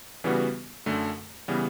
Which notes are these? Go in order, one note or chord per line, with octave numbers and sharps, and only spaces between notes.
C#3 E3 G3 B3 F#4
F#2 D3 A3
C#3 E3 G3 B3